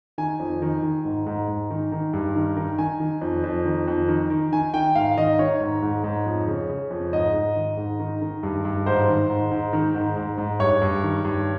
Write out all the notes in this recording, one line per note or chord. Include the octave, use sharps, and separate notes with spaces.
D#3 G#5
F2
D#3
D#3
G#2
G#2
G#2
D#3
D#3
G2
D#3
D#3
D#3 G#5
D#3
F2
F2
D#3
F2
D#3
D#3
D#3 G#5
D#3 G5
G#2 F5
D#3 D#5
D#3 C#5
G#2
G#2
G#2
F2
C#3
C#3
F2
G#2 D#5
G#2
D#3
G#2
D#3
D#3
G2
G2
G#2 C5
D#3
G#2
G#2
D#3
G#2
G#2
G#2
G2 C#5
G2
D#3
G2